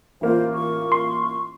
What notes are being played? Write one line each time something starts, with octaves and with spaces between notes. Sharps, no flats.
A1 A#3 F4 C5
C#6
C6